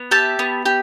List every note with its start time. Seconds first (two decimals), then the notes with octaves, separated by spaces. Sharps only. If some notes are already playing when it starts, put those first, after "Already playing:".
Already playing: B3
0.11 G4 E5 A5
0.39 B3
0.66 G4